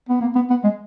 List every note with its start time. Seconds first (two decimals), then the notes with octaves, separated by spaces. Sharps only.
0.09 B3
0.21 A#3
0.35 B3
0.50 B3
0.64 G#3